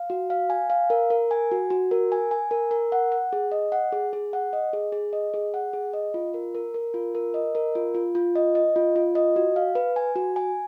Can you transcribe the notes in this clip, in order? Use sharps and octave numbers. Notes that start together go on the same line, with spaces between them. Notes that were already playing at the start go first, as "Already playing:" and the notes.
Already playing: F5
F#4
F5
G#5
F5
A#4
A#4
G#5
F#4
F#4
A#4
G#5
G#5
A#4
A#4
F#5
F#5
G#4
D#5
F#5
G#4
G#4
F#5
D#5
G#4
G#4
D#5
G#4
F#5
G#4
D#5
F4
A#4
A#4
A#4
F4
A#4
D#5
A#4
F4
F4
F4
D#5
D#5
F4
F4
D#5
F#4
F5
B4
G#5
F#4
G#5